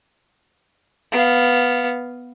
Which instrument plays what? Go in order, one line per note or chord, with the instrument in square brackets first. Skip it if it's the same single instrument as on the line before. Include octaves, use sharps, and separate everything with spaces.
[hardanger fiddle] B3 F5